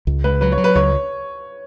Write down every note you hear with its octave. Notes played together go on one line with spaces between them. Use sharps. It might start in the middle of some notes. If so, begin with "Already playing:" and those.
C#2
C#2 B4
F#3 B4
C#5
F#3
B4
C#2 C#5